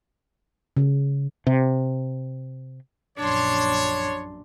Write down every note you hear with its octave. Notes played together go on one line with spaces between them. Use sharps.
C#3
C3
A#1 F#2 D4 C#5 C6